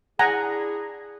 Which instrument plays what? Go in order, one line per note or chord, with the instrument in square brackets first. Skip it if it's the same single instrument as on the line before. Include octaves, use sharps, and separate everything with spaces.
[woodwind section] D4 E4 G#4 [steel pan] F#5 G#5 A#5